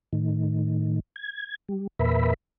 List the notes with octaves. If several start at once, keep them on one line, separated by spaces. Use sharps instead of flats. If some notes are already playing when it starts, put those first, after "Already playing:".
A2 D#3
G#6
G3
E2 A#2 A#4 B4 E5 B5